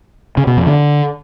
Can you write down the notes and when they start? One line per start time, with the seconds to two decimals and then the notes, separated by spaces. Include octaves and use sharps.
0.37 C#3
0.47 B2
0.57 F2
0.67 D3